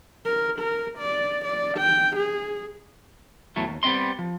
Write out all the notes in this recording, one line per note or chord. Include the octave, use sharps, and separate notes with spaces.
A#4
A#4
D5
D5
G5
G#4
E2 A2 F#3 A3
D#2
G3 B3 C4 D#5 C6
F3